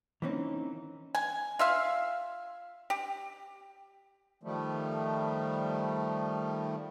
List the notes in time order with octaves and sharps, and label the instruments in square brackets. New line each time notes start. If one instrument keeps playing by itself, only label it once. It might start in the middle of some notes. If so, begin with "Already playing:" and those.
[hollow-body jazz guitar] E3 A#3 C4 C#4 D#4
[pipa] G#5
F4 E5 F5
G4
[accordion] D#3 F3 G3 A3